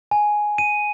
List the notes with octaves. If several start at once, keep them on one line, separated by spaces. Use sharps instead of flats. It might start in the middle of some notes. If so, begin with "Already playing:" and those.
G#5
D#7